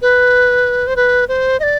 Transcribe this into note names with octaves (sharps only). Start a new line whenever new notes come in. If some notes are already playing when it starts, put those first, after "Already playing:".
B4
C5
B4
C5
D#5
D5